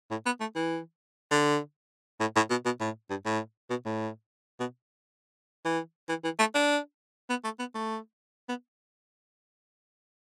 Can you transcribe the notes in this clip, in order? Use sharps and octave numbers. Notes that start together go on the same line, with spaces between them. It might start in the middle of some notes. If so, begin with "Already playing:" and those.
A2
B3
A3
E3
D3
A2
A2
B2
B2
A2
G2
A2
B2
A2
B2
E3
E3
E3
A3
D4
B3
A3
B3
A3
B3